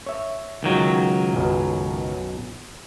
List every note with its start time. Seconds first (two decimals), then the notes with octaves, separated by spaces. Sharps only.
0.06 C#5 E5
0.63 C#2 D#3 F#3
1.33 B1 F#2 B2